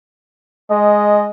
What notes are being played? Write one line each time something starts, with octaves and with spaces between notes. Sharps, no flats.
G#3 D#5